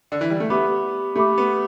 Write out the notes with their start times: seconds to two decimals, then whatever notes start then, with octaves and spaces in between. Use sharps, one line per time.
0.12 D3
0.21 E3
0.30 G3
0.40 A3
0.50 B3 G4 E5 B5 D6
1.16 A3 G4 E5 B5 D6
1.38 B3